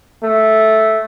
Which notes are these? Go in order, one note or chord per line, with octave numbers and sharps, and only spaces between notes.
A3